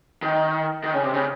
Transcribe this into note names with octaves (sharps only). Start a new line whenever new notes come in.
D#3
D#3
C#3
C3
C#3